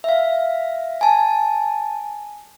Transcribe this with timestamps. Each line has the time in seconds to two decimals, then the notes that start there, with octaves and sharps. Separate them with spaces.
0.04 E5 F5
1.01 G#5 A5